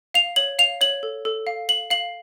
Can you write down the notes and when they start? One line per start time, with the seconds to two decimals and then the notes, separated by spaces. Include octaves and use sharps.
0.14 F5 F7
0.36 C#5 F#7
0.59 F5 F7
0.81 C#5 F#7
1.03 A4
1.25 A4
1.47 F5
1.69 F5 F#7
1.90 F5 F#7